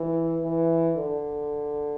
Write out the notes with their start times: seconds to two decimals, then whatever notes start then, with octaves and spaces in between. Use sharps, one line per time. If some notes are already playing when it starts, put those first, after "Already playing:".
Already playing: E3
0.44 E3
0.97 D3